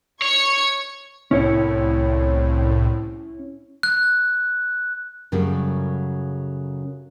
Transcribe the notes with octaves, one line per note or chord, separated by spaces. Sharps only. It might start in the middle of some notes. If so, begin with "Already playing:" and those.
C#5 C#6 G#6 C#7
C2 A2 C#4 E4 C#5
F#6
F#2 C#3 F#3 G3 A3 C#4